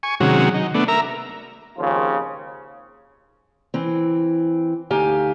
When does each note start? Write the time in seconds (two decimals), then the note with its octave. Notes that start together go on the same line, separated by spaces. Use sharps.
0.03 G#5 C#6
0.20 C3 D#3 F#3 G#3 C#4 F#4
0.54 D#4
0.75 A3 B3 D4
0.88 A#4 E5 A#5
1.78 G#1 D#2 C#3 F3 F4
3.74 E3 C4
4.90 D2 D#4 G4 F5 G#5